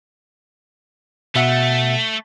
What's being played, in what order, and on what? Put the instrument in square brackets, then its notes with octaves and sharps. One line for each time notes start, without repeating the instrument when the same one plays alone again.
[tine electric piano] B2 E5 F#5 [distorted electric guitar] A3